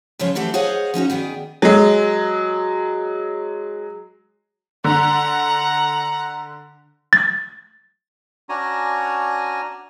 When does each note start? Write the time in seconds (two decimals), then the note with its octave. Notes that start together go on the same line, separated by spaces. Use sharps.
0.19 C#3 F3 G#3 F4 C#5
0.35 E3 A3 F#4 G4 A4 C5
0.54 G#4 C5 C#5 D#5 F5 F#5
0.94 F3 C#4 D#4 F#4
1.10 D#3 B3 G#4 D5
1.62 F#3 G#3
4.84 D3 F#5 A#5
7.13 A6
8.49 C#4 D4 F#4 G#5 A#5